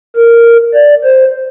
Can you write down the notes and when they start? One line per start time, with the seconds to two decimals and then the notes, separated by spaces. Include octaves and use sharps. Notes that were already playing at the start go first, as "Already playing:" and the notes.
0.16 A#4
0.74 D5
1.04 C5